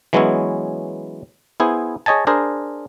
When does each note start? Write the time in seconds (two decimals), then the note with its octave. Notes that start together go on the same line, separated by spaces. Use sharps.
0.13 E3 F#3 G#3 B3 C#4 E4
1.60 B3 E4 G#4 C5
2.06 G#4 C#5 D#5 G#5 A5
2.27 D4 G#4 A#4 C5